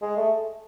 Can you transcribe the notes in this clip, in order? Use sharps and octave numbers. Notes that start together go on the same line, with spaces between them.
G#3
A3